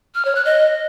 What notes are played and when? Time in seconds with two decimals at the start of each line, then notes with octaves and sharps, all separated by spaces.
0.15 F6
0.25 C#5
0.35 F#6
0.45 D#5